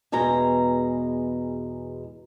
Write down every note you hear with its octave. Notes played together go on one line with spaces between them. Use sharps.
E2 B2 G#3 A#5